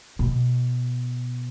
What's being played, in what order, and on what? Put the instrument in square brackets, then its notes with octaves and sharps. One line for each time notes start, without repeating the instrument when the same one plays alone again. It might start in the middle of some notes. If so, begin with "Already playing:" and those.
[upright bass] B2